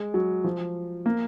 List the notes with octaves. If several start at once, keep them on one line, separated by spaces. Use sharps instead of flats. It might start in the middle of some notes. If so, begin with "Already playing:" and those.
Already playing: G#3
F#3
F3
A#3